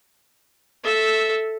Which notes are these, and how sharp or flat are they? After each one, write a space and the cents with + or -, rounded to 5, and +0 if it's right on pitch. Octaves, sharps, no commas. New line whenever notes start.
A4 +0 E5 -10